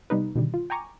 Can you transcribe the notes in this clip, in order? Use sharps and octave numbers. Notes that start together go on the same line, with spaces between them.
C3 G3 B3 D#4 B4
B2 D3 D#3 G3
F4
G5 G#5 A#5 C#6 D6